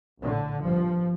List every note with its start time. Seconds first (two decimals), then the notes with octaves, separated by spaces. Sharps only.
0.21 A#1 A2 D3
0.62 G1 G2 F3